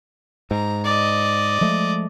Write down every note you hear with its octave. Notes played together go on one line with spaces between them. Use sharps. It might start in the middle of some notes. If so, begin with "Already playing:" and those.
G#2 A#5
D5 D#5
F3 G#3 A3